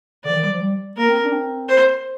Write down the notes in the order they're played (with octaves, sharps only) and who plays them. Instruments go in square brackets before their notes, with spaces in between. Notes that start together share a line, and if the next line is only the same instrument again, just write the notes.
[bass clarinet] D3 [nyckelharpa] D5
[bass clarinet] F3
D#3
G3
F3
G3
[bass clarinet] A#3 [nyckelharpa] A#4
[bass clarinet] C4
D4
C4
[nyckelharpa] C5